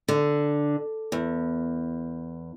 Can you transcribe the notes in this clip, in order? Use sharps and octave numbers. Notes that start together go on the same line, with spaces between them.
D3
E2